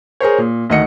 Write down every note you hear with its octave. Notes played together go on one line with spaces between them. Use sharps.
G#4 A#4 C5 C#5
A#2
D2 D#3 D#5 F#5 C#7